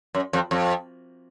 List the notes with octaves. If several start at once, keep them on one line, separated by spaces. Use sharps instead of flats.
F#2
F2
F2